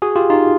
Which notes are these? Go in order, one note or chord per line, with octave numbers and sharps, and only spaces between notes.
F#4 G#4
F4 G4
D#4 F4